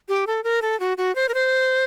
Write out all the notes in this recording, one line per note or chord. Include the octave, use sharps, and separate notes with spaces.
G4
A4
A#4
A4
F#4
F#4
C5
A#4
C5